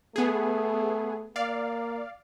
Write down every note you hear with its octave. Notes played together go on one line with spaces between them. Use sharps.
A3 B3 G#4
A#3 D5 F5